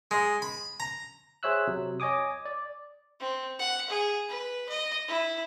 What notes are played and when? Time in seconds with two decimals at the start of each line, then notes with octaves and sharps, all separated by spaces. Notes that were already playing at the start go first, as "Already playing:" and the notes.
0.11 G#3
0.42 B5
0.80 A#5
1.43 G#4 C5 C#5 E5 E6 F#6
1.67 C3 F#3
2.00 C#5 D#5 G#5 D6 D#6
2.46 D5
3.20 C4
3.59 F#5
3.90 G#4
4.29 B4
4.69 D#5
5.08 E4